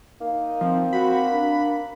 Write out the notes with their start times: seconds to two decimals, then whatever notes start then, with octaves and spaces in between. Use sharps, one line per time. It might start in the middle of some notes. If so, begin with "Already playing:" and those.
0.21 A#3 D#4
0.61 F3 C4
0.93 F#4 B5
1.31 D4 A#4